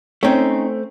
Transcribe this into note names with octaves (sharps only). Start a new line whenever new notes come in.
A3 C4 C#4 D#4